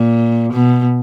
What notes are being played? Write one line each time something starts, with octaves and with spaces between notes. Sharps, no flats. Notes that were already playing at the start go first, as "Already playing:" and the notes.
Already playing: A#2
B2